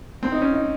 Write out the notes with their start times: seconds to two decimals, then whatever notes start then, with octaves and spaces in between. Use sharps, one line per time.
0.23 C4
0.32 D#4
0.41 C#4
0.52 D#4